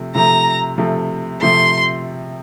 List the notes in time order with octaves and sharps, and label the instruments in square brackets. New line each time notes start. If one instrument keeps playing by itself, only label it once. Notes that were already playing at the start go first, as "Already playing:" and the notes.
Already playing: [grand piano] C3 F3 A3
[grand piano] C3 F3 A3 [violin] A#5
[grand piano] C3 F3 A3
[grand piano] C3 F3 A3 [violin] C6